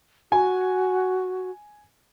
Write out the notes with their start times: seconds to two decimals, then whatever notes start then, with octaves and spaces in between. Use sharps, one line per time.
0.32 F#4 G#5